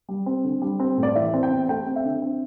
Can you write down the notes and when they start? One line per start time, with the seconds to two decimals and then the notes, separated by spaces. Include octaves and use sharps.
0.09 G3
0.26 C4
0.44 D3
0.62 G3
0.80 C4
0.98 A2
1.03 D5
1.15 E3 E5
1.34 C4
1.43 G5
1.51 E2
1.69 A3 G5
1.87 C4
1.96 E5
2.05 D3
2.22 C4